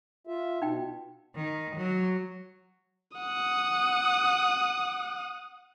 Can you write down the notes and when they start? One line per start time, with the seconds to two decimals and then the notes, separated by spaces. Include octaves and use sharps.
0.27 F4 E5
0.62 B2 D#4 G5
1.35 D#3
1.77 F#3
3.17 F#5 D#6